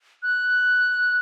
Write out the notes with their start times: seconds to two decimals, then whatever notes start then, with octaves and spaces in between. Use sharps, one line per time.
0.23 F#6